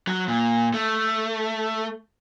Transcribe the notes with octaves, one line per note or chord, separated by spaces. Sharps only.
F#3
A#2
A3